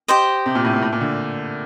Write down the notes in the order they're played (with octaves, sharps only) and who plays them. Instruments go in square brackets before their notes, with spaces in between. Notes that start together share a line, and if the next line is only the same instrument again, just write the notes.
[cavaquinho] G4 C5 D#5
[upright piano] C3
A#2
A2
A#2
A2
A#2
D3